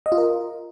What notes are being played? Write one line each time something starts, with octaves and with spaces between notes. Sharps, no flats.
D#5
F4
A#4